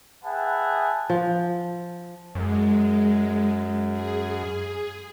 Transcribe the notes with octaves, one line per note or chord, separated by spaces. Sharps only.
G#4 B4 E5 F#5 G5 A5
F3
F#2 G#3
G#4